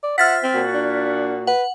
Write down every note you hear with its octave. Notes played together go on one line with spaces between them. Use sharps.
D5
F4 C5 E5 F#5 F6 A6 B6
C4
A#2 F#4
D4
B4 F#5